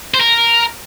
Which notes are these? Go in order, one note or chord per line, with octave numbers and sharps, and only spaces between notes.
C5
A#4